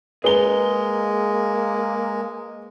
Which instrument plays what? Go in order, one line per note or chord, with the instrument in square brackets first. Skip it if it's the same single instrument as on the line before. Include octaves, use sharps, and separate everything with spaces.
[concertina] G#3 [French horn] A#3 [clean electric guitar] G#4 A#5 [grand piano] B4 G7